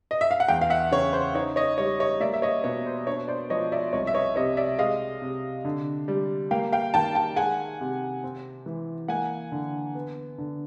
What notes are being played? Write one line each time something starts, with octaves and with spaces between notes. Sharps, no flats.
D#5
E5
F5
F#5
E2 F5 G5
F5
E5 F#5
C#3 C#5
C5
D#4 C#5
C#5 D#5
G3 C#5
C#5 D#5
A#3 D5 E5
E5
C#5 D#5
B2 C#5
C5
D4 C#5
C5 D5
F3 C#5 D#5
D5 E5
C2 C#5 D#5
E5
C#5 D#5
C3 C#5 D#5
D5 E5
G#3 D#5 F5
C3
D3
G3
A#3 F5 G5
F5 G5
D#3 G5 A5
G5 A5
G#3 F#5 G#5
C3
C4
E3
A#3 F#5 G#5
D3
B3
D3